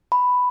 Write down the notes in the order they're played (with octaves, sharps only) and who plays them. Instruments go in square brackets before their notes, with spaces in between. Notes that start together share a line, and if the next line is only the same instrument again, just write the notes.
[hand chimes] B5